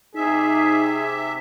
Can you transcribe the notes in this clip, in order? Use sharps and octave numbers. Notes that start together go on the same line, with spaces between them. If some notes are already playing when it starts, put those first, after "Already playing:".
C3 D#4 G#4 E5